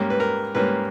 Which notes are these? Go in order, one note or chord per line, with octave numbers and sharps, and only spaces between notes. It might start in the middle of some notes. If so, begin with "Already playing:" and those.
Already playing: G#2 G3 A#3 C#4
B4
A#4
G#2 G3 A#3 C#4 B4